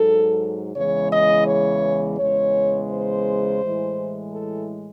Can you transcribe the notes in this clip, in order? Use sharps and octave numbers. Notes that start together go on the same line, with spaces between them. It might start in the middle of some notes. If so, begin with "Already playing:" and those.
Already playing: G#2 F#3 A4
E2 C#3 E3 G#3 C#5
D#5
C#5
E2 C#3 G#3 C#5
C5
A2 E3 G#3
A4